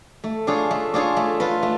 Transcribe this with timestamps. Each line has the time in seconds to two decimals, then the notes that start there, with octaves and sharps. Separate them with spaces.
0.24 A3
0.47 D4 F4 G#4 C#5
0.71 A3
0.94 D4 F4 G#4 C#5
1.17 A3
1.40 F4 B4
1.63 A3